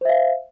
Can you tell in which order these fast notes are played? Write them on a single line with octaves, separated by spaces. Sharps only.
C5 E5 F5